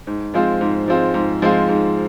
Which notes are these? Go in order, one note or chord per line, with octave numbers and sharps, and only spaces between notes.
G#2
F3 G#3 C4 F4
G#2
F3 G#3 C4 F4
G#2
F3 G#3 C4 F4
G#2